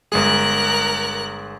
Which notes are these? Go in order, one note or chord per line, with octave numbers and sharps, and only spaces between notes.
G1 G#3 G#4 A#4 F#6